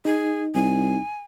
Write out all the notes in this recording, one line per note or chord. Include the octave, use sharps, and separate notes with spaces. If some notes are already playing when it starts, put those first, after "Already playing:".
D#4 G#4
C2 G#5